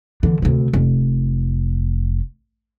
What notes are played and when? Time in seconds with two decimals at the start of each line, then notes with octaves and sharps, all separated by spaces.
0.23 D3 E3
0.42 D2 C3
0.73 F1